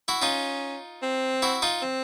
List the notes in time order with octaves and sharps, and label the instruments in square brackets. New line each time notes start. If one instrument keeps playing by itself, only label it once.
[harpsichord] E4 F#4
[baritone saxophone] C#4 [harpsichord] D#4 F4
[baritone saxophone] C4
[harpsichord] E4 F#4
D#4 F4
[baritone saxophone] C4